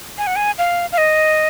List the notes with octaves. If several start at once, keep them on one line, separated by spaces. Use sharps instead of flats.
G#5
F#5
G#5
F5
F5
D#5